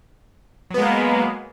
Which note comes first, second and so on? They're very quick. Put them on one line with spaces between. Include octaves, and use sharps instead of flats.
F#3 B3 G#3 A#3